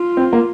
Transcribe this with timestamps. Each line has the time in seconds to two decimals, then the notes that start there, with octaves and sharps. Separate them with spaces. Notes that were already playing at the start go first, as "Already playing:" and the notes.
Already playing: F4
0.17 C4
0.33 A#3